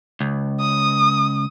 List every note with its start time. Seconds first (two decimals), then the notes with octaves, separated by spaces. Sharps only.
0.20 C#2
0.61 D#6